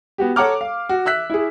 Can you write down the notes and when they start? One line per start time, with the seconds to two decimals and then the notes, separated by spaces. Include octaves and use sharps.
0.18 B3 F#4 G4
0.36 A4 C#5 F#5 A#5 D6 F6
0.61 F5
0.89 F#4
1.06 E5 E6 F#6 B6
1.30 E4 G#4